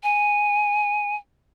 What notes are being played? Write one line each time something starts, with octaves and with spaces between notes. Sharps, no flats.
G#5